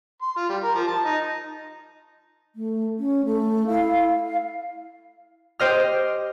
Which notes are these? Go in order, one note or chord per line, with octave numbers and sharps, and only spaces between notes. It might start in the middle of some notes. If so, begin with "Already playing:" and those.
C6
F4
G3
A#4
F3
A5
D#4
A3
C#4
A3
E4 F5
F5
G4 C5 D#5 F6